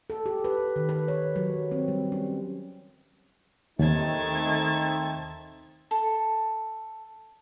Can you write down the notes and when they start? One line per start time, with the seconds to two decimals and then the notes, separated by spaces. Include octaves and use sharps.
0.10 A4
0.26 G4
0.44 B4
0.76 D#3
0.89 B4
1.08 C#5
1.36 F#3
1.71 C4
1.88 G3
2.12 C#4
3.79 D#2 D#3 A3 C4 D#4 A5 G#6
5.91 A4